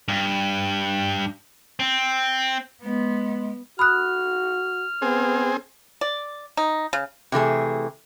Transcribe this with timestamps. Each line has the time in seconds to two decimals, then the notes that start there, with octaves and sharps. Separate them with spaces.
0.08 G2
1.80 C4
2.83 G#3 B3
3.79 F#4 B5 D#6 F6 F#6
5.02 B3 C4 G#4
6.01 D5
6.57 D#4
6.93 C#3
7.32 C3 E3 A3 G#4